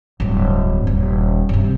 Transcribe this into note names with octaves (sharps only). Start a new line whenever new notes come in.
D1 G2
D#1
G2 C3